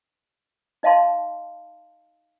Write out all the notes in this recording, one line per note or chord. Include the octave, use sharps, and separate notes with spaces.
D#4 D#5 F5 A5 C6